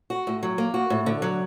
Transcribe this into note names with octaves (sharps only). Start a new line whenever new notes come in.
F#4
A2
F#3
A#3
F#4
A2
D3
F#3